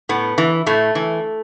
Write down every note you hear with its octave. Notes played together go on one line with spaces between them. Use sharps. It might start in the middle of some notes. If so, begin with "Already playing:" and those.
A2 B3
E3
A2 A3
E3